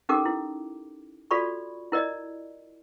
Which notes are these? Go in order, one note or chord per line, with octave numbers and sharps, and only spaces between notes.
C#4 D#4 G4 A4 A#4 D6
E4
F4 F#4 A4 D5 B5 C#6
E4 A#4 D5 D#5